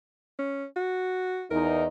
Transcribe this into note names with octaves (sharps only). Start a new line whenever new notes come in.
C#4
F#4
E2 D#4 A#4